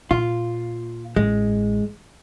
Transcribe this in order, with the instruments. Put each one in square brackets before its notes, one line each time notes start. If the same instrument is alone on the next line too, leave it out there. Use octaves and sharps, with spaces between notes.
[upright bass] A#2 [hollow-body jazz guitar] F4
[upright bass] A1 [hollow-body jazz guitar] G#3